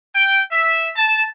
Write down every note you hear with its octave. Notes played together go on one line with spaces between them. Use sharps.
G5
E5
A5